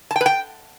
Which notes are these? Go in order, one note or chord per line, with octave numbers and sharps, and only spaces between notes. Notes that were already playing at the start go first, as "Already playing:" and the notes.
A5
G5
B4
G5